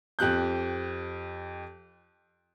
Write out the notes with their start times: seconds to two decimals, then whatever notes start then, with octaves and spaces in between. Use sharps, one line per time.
0.19 F2 G4 F#6 G6